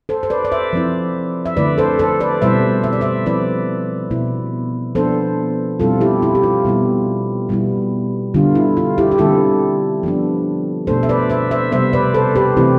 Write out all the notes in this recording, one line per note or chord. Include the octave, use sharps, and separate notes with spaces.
A4 C5
C5
B4 D5
D5
C5 E5
F3 C4 E4
E5
D3 A3 E4 B4 D5
A4 C5
A4 C5
B4 D5
B2 G3 C4 E4 C5 E5
E5
D5
C5 E5
F3 C4 E4 B4 D5
B2 B3 E4
F3 B3 D4 A4 C5
B2 G3 C4 E4 F4 A4
E4 G4
E4
G4
F4
B2 G3 B3 E4
B2 G3 B3 E4
D3 G3 B3 D4 F4
E4
F4
E4 G4
G4
D3 G3 C4 E4 F4 A4
F3 B3 D4
B2 A3 D4 A4 C5
E5
B4 D5
C5 E5
C5 E5
C3 G3 B3 C5 E5
B4 D5
A4 C5
G4 B4
C3 E3 A3 C4 E4 G4